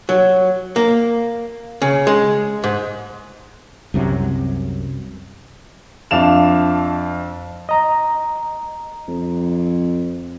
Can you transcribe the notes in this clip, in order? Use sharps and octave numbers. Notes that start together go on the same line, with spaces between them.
F#3
A#3
C#3
G#3
G#2
C2 F#2 C3 F#3
F2 D4 E5 F5 E7 F7
D#5 A#5
F2